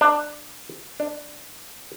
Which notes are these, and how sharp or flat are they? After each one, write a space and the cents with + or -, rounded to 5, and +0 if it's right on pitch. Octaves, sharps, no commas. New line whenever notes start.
D4 +15
D4 +10